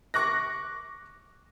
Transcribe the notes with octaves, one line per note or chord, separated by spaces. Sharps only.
C#6 D6 F#6 A#6